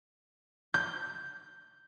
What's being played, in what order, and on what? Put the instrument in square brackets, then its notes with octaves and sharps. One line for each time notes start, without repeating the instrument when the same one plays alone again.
[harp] G6